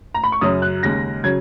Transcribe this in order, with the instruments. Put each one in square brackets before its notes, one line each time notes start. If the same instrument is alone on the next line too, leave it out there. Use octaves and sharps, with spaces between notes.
[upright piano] A#5
B5
C#6
F#2 C#3 F#3 D#6
F#6
D#2 C#3 G#3 A#6
C#3 F#3 G#6